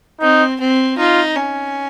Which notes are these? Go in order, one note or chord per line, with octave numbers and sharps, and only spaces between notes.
C4 D#4
C4
D#4 F4
C#4